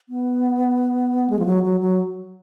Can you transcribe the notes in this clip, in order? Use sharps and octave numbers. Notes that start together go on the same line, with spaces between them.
B3
G#3
F3
F#3
F#3
F#3